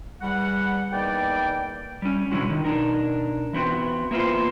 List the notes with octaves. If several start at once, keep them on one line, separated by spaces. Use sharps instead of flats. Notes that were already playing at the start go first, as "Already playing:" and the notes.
E2 G3 F#5
E2 D#3 G3 A#3 D5 G5
G3 C#4
B2 D3 E3 F#3 G#3 F#4
D#3
B2 D4 D#4 A#4
E3 B3 C4 F#4
A#3 B3 E4 F4 B4 C5